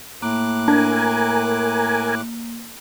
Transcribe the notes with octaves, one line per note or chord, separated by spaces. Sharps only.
A2 A#3 D6 F#6
D4 A#4 G#5